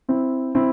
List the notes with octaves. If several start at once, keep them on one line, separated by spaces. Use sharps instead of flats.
C4 E4
C4 E4